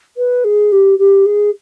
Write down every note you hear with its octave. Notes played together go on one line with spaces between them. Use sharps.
B4
G#4
G4
G4
G#4